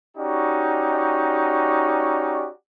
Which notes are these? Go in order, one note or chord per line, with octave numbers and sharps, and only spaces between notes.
C#4 D#4 F#4 G4 D5